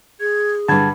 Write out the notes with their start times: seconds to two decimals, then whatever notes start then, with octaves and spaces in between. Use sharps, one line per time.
0.20 G#4 G#6
0.68 G2 D3 A5 B5 G#6